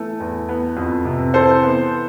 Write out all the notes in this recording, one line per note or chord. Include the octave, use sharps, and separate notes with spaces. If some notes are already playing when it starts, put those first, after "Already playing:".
Already playing: E3 A3
E2
B3
F2
C3
E3 A4 C5
B3